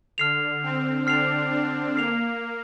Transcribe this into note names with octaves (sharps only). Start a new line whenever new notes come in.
D3 F6 C7 F7
C4
D4 F6 C7 F7
D4
A#3 F6 C7 F7